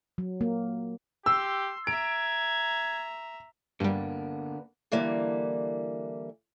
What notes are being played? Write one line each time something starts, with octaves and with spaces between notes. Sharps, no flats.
F#3
A#3
G4 C6 E6
E5 A#5 G#6 D7
G2 D3 G3 A#3 B3
D3 E3 G3 A#3